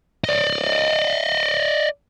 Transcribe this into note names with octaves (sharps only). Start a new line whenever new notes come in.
D5 D#5